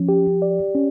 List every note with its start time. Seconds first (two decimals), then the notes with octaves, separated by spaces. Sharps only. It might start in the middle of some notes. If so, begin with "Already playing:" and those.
Already playing: F3 C#4
0.09 G4
0.42 D5
0.75 C#4